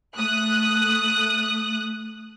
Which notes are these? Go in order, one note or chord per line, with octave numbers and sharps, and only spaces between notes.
A3 D#6 F#6